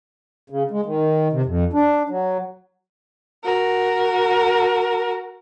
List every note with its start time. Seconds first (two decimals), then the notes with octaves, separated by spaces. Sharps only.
0.50 C#3
0.71 G#3
0.86 D#3
1.32 C3
1.45 F2
1.73 D4
2.09 F#3
3.44 F#4 A#4